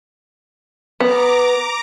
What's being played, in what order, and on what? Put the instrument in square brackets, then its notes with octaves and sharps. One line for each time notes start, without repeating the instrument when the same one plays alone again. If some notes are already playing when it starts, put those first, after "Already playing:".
[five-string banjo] B3 [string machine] A#5 D6